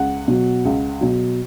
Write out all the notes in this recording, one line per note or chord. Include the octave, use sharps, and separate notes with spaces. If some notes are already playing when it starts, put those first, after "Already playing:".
Already playing: C#2 F#5
B2 F#3
C#2
B2 F#3